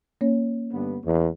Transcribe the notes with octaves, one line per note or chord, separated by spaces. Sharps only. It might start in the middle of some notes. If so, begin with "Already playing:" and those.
A#3 C#4 C#5
G2 D3 B3
E2